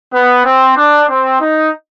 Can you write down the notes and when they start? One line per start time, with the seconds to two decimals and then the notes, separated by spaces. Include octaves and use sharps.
0.13 B3
0.45 C4
0.77 D4
1.10 C4
1.41 D#4